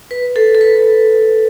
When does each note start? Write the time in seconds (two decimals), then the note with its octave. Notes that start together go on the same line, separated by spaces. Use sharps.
0.11 B4
0.36 A4
0.55 A4
0.61 B4